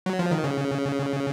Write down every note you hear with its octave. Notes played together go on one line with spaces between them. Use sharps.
F#3
F3
D#3
C#3